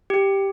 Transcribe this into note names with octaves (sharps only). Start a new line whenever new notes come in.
G4